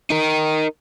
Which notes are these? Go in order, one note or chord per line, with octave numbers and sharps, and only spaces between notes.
D#4 A#4